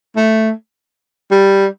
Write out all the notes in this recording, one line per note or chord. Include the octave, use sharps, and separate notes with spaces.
A3
G3